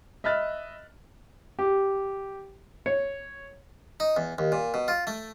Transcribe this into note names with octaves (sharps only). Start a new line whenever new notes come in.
D#5 E5 B5 F6 F#6 A6
G4
C#5
D#4
E2
D#2
A#2
B2
F4
A3